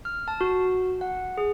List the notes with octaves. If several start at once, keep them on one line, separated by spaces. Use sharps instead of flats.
F6
A5
F#4
F#5
G#4